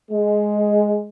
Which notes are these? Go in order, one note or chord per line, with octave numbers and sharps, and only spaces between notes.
G#3